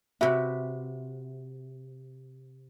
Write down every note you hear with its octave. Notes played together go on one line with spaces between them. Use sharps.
C3 F#4 B4 E5